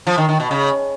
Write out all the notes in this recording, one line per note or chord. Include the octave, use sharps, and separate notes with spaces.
F3
D#3
D#3
B2
C#3